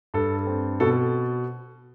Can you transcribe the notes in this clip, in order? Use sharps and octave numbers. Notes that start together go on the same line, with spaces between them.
G2 A4
C4
B2 A4